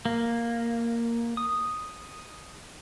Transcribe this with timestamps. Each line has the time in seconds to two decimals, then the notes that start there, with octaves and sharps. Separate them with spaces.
0.05 A#3
1.37 D#6